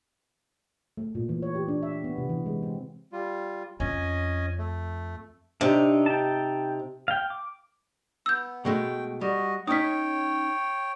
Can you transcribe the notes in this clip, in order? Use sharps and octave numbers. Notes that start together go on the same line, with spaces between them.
A3
A#2
E3
C#5
G4
D4
E5
B3
C3
E3
G#3
C4
G3 F4
F2 C#4 D#5 G#5
A3
C3 D4 D#4
G5 A5
F5 G5
D6
B3 E6 G6
B2 G#3 A3 G5
G3 F#4 D#5
C#4 D#4 C#5 G5 D#6 B6